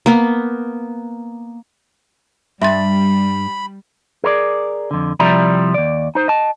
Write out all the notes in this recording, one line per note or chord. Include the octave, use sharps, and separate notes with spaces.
A#3 B3
G2 G3 E5 B5 C6 A6
G#4 A#4 C5 D5
F2 D3
C3 F3 G3 E4 D5 A#5
D#2 D5
D#4 C5
D#5 A5